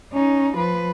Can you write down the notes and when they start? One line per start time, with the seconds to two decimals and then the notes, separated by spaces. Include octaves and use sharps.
0.14 C#4 D#4
0.57 F3 B4